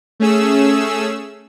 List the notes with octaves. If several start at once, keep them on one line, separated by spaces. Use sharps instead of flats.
A3 C#4 G#4 E6